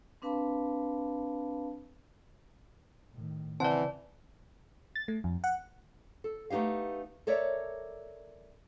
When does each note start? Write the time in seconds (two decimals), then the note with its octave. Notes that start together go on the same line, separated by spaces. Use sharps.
0.22 C4 D4 B4 F5 A5 B5
3.12 A2 D#3
3.60 C#3 E3 C4 C5 D5 F#5 A5
4.96 A6
5.08 A3
5.24 F2
5.44 F#5
6.24 A4
6.50 A3 B3 D#4 G4 F5
7.27 A4 A#4 C#5 D5 E5